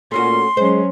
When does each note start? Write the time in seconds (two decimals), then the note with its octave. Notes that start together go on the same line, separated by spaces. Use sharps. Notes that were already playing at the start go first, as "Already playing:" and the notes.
0.12 A#2 A3 C#4 F#4 C6
0.57 F#3 G#3 C#4 C5